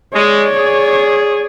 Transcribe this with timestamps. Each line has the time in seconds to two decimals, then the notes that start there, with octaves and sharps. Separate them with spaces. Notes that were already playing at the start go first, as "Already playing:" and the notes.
0.14 G#3 C#5 D5
0.56 G#4